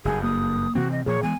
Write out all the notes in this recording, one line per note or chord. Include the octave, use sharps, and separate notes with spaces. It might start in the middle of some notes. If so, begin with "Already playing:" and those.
F#1 G2 G#4
A#3 D#6
C3 E3 C4 F#4
D#5
A#2 F3 G#4 C#5
E3 G#3 B3 G#5